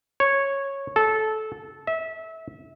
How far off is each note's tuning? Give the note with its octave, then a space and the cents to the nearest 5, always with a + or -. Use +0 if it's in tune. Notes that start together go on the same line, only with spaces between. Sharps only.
C#5 -10
A4 -20
E5 -25